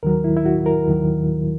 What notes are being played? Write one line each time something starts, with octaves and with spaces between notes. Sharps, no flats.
D#2 D#3 F#3 A#4
E4
E4
F#4
A#4
D#2 D#3 F#3